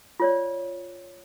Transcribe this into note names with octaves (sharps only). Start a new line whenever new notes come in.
F4 C#5 D5